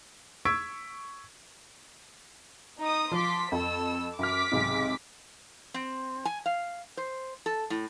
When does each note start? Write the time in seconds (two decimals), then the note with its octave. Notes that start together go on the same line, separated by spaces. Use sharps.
0.45 C#6 E6 G#6 B6 D7
2.79 D#4 D#6
3.11 F3 C6 D6 B6
3.52 F2 A4 E6
4.19 F#2 D6 F6 B6
4.52 B1 G#2 C3
5.74 C4
6.25 G#5
6.46 F5
6.97 C5
7.46 A4
7.70 A2